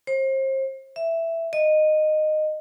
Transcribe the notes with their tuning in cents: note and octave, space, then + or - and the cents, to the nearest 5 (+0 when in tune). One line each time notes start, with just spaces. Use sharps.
C5 +35
E5 +5
D#5 -15